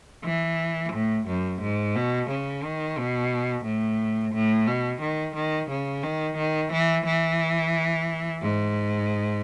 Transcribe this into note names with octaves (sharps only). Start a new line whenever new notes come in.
E3
A2
F#2
G#2
B2
C#3
D#3
B2
A2
A2
B2
D#3
D#3
C#3
D#3
D#3
E3
E3
G#2